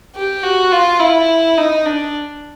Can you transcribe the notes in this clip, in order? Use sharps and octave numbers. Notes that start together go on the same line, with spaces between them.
G4
F#4
F4
E4
D#4
D4